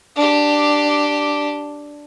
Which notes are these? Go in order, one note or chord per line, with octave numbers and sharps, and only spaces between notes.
D4 G4